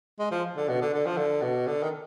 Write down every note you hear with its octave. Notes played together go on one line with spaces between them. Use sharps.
G#3
F3
D3
B2
D3
D3
F3
D3
B2
D3
D#3